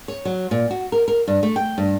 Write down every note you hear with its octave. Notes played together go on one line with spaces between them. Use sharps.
C#5
F#3
A#2
F#4
A#4
A#4
G2
A3
G5
G2